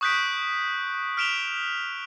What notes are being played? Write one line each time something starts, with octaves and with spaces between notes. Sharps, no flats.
C#6 D#6 F#6 G6 B6 D7
F6 B6 D7 E7 F7 G7